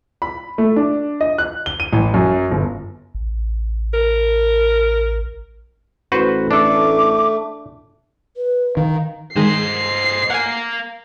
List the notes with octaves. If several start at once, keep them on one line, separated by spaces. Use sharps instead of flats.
B5
A3
D4
D#5
F#6
G7
D#7
A1
F#2
G1
A1
A#4
A1 F#4 B4 C5
A3 D4 A4 D6
B4
D#3 F5
D#3 G#3 C5 D#5 C7
A#4 F5 F#5 G#5